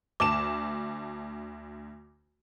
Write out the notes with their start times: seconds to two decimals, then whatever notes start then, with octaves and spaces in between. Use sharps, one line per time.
0.20 D2 A5 D6 E7